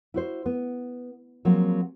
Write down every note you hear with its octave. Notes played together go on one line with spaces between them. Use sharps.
E4 F#4 C5
B3
F3 F#3 G#3 A#3 C4